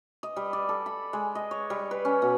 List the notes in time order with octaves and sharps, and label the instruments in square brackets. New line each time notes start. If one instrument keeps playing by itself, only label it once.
[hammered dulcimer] D#5
G3
D5
A4
B5
G#3
D#5
C#5
G3
B4
C#4
B2